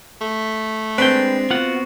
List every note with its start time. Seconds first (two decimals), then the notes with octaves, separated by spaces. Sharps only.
0.21 A3
0.98 G#3 C4 D4 B4 G5
1.51 B3 F4 F#4 F#5